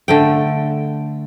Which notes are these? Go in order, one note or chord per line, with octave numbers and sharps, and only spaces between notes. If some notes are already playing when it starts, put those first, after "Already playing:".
D3 A3 G5